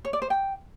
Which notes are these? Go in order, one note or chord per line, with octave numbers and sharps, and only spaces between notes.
C#5
D5
C5
G5